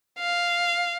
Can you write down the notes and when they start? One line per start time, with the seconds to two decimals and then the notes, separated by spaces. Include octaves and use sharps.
0.19 F5